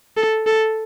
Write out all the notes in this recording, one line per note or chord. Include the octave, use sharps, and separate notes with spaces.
A4
A4